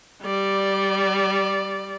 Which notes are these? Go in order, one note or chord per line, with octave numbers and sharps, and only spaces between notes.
G3 D5